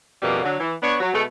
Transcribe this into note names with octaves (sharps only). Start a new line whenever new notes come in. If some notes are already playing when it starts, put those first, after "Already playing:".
F2 B2 G3 A#3 D4
D3 F#3
E3
B3 D4 C#5
F#3
B2 G#3 A3